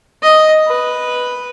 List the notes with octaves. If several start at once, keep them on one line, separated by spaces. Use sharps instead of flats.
D#5
B4